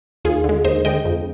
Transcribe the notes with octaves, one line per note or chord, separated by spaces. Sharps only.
D#2 F4 G#4
D3 G#3
D#2 C5 D#5
D3 G#3 D#5 G5
F2